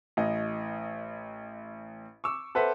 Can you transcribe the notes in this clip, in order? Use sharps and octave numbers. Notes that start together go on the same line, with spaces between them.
A1 D#5
C#6 D6 E6
A4 B4 C5 E5 F#5